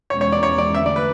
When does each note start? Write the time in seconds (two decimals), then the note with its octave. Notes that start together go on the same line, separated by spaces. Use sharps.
0.10 E2 B2 G#3 C#4 C#5
0.21 C#5
0.32 D5
0.43 C#5
0.58 D5
0.75 D3 A3 D4 E5
0.86 D5
0.96 B4